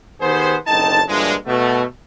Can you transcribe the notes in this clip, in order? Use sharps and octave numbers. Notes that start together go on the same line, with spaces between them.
D#3 B3 G4 G#4 C5
F#1 B1 D3 C4 D#4 A5
G2 A#2 D3 E3 F3 G#3
B2 A3